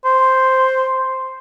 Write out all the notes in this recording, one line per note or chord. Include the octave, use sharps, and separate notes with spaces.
C5